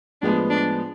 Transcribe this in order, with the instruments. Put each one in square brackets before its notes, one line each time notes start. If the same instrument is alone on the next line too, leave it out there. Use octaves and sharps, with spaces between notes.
[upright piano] A2 F3 G#3 B3 [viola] D4
[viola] D4